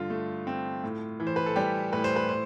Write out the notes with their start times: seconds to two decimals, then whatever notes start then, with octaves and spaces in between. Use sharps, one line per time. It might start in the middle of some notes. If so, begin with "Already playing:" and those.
Already playing: G2 D3 F4
0.10 A3
0.47 C4
0.84 A2
1.20 E3
1.27 C5
1.36 B4
1.46 A4
1.56 G3 G4
1.93 A2 B4
2.04 C5
2.16 B4
2.29 C5